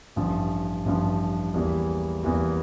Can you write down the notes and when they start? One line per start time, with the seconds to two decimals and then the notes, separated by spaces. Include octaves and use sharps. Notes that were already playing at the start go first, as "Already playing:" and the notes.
0.16 A1 G2 F3
0.85 A1 G2 F3
1.54 E2 E3 G3 A#3
2.23 E2 E3 G3 A#3